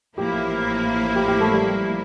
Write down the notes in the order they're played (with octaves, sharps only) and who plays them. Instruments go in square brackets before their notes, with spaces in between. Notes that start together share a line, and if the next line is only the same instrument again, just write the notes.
[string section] A1 A2 F3 A#3 E4 [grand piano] G4
[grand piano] G4
G4
A3
G3